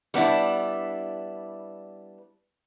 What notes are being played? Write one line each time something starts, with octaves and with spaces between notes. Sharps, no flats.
G3 B3 D4 E4